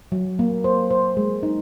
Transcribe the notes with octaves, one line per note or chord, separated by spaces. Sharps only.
F#3
A#3
C5
C5
G#3
D#4